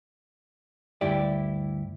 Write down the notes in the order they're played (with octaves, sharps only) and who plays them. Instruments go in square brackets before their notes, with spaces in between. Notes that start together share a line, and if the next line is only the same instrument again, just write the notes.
[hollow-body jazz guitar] D2 G2 E4 G4 D5